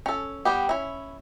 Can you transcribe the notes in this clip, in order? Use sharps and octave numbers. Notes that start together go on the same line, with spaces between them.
C#4 A4
G3 B3 G4
C#4 E4